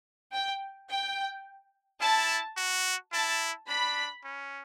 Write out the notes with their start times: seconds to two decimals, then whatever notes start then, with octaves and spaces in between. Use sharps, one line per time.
0.33 G5
0.90 G5
2.02 E4 A5
2.57 F#4
3.13 E4 A5
3.69 D4 B5
4.25 C#4